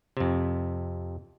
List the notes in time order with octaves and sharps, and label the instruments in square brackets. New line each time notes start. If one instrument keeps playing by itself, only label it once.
[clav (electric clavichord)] F2 C3